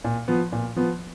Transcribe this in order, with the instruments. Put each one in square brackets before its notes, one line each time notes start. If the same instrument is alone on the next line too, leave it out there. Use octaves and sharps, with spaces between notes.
[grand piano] A#2
F3 B3
A#2
F3 B3